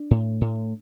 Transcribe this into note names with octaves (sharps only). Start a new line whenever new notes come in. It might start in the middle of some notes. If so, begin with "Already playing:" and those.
Already playing: D4
A2
A2